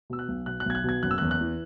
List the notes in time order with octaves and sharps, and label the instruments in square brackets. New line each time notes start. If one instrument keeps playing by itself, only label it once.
[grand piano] B2 E6
F#6
B1
B2 F#6
F#6
B1 G#6
F#6
B2 G#6
F#1 F#6
E6
E2 F#6
F#6
E3